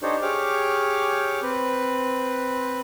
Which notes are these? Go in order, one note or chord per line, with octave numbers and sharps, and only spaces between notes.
D4 D#4 G4 A4 C5 C#5
G4 G#4 C#5 D6 F6
C4 B4